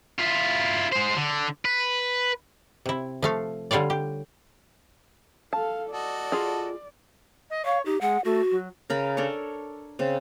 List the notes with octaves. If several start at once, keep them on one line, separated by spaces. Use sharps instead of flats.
E4 F4
G#3 C5
D3
B4
C3 E4
F3 A3 F5
D3 G3 F4 C#5 D5
G4
A4 F5 A5
F#4 A4 D5 D#5
F4 G#4
D#5
C#5 F5
D#4 G4
G#3 F#5
A3 F#4
F#3
C#3 A#4 B5
D4 A4 A#4 C#5
C#3 C4